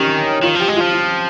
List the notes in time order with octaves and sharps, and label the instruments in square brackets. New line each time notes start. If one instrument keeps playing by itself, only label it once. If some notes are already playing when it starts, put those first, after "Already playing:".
Already playing: [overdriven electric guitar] D#3 [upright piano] C#4 G4
[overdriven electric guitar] D#3 [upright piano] F4
[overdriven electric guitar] F3
[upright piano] G4
[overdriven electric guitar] G#3
[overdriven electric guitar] F3 [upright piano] F4
[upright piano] F4